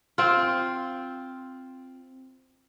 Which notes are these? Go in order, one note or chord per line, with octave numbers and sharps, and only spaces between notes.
C4 F4